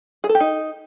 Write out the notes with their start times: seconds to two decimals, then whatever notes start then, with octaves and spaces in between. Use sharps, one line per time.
0.24 G#4
0.29 A4
0.35 G4
0.40 D#4